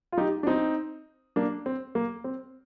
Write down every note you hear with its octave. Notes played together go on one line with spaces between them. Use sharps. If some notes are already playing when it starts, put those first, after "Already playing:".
F4
D#4 G4
D4
C4 D#4
A#3 D4
C4
A#3
C4